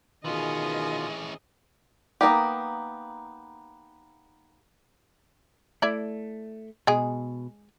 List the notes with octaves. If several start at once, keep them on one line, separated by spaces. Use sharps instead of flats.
B2 D#3 E3 C#4 F4 G#4 D#5
A#3 B3 D#4 G4
A3 E4 D5
B2 G#3 G#4